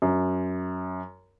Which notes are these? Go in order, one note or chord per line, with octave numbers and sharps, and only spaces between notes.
F#2